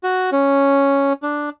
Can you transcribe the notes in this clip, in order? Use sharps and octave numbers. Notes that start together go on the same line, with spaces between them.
F#4
C#4
D4